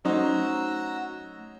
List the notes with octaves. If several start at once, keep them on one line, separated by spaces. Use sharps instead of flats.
F#3 A3 C#4 D#4 F#4 C5 A#5 E6